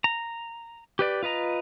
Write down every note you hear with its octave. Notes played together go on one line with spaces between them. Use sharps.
A#5
G4 B4 D5
F4 B4 D#5 A#5